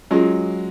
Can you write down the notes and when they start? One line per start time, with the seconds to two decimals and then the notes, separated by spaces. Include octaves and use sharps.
0.11 F#3 G#3 C#4 F4 G#4